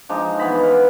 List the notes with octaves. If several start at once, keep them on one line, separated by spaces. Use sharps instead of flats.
F3 G#3 D4 D#4
E3 B3 B5
F5